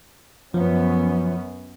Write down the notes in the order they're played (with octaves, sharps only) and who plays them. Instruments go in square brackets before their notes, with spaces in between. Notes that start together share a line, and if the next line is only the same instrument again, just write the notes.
[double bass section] F#2 B3 C#4 [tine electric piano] F3